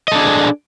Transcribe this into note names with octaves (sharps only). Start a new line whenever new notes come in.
D4 G#4 A4 D#5